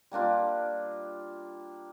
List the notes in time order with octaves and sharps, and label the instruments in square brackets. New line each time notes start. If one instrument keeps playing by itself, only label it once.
[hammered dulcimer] G3 A#3 D4 F4